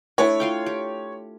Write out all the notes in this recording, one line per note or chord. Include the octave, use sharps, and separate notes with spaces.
A3 D4 E4 C#5
F4 F5 G5
G4